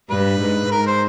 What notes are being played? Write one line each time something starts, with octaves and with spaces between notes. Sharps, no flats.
G2 B4
G#2
G#2 A#4
C5